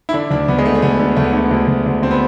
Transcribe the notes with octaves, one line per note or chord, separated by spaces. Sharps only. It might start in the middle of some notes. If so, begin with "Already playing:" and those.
E4
D3 D4
D2 D4
D2 B3
G#3
D3 A3
A3
D2 B3
D3
D2 A3
B3
D3 A3
D2
D2
D2
D2 C4
B3